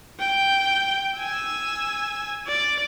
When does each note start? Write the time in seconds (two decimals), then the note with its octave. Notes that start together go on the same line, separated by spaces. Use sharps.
0.20 G5
1.18 G#5 E6
2.48 D5